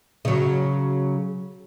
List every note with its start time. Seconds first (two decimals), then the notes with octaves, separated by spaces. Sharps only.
0.25 C#3 F#3